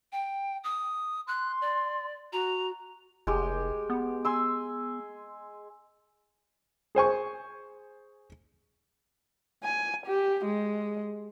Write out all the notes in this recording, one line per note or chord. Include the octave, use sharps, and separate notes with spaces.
G5
D#6
C6 F#6
D5
F#4 A#5
F1 G#3 G4
B3
G#5 C6 E6
G#4 C5 G#5 C#6
G#5
G4
G#3